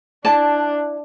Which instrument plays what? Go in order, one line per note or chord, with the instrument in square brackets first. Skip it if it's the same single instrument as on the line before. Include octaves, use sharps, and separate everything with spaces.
[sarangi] D4 [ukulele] E4 D5 A5